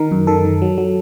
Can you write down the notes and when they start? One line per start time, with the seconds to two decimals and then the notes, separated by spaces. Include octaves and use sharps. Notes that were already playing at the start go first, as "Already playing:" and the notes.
Already playing: D#3 A#4
0.12 F#2
0.27 D#3 A4
0.45 D#3
0.62 F#3
0.78 F#3